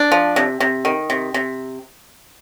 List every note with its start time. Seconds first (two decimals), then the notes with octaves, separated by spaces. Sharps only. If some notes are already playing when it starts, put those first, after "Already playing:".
Already playing: D4
0.12 F3
0.36 C3
0.60 C3
0.85 D#3
1.10 C3
1.34 C3